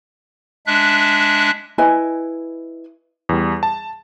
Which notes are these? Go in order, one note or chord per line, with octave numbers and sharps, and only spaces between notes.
G#3 D4 E5 F#6
E4 B4 D#5 G#5
E2 G3
A5